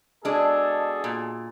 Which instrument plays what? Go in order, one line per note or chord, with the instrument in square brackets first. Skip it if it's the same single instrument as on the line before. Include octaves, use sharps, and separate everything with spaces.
[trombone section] B2 G#4 A4 [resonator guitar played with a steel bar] G#3 D4
[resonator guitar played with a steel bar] A#2